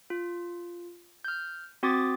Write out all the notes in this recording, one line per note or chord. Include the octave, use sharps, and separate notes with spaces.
F4
F6 G6
C4 F#4 C6 D6 D#6 A6